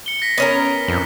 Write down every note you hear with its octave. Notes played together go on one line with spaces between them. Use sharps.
C#7 G7
A#6 B6
B3 C#4 A#4
F2